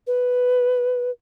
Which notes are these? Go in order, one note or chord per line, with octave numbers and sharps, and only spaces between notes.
B4